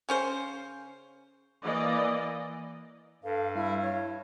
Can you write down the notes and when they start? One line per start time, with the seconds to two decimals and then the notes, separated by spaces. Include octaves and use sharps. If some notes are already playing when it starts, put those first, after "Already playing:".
0.09 C#3 C#4 C5
1.64 E3 A#3 D5 D#5
3.23 G2 A4 F5
3.55 G3 E4 F5
3.82 E4 C#5